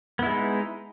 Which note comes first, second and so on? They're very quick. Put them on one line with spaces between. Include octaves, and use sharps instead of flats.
B3 E4 G#3 D#4